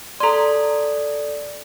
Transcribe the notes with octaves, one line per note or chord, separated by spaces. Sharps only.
A4 D5 A#5 C6